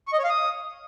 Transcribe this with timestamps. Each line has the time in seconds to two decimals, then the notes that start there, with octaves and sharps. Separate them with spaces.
0.08 C#6
0.13 D#5
0.19 C#5
0.24 F5
0.30 D#6